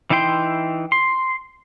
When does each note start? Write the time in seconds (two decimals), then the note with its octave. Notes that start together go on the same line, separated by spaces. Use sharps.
0.10 E3 D#4 E4 G5 C6
0.92 C6